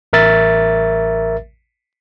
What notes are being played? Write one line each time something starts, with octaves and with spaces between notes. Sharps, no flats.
A1 A#4 E5 A6